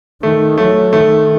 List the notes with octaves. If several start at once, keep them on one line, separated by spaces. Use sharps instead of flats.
D#3 A3
F#3 A3
D#3 A3